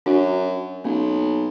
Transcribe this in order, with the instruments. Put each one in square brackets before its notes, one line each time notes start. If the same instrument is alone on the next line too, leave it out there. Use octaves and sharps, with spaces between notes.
[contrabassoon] F#2 [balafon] D4 F#4
[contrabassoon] B1 [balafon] A#3 C#4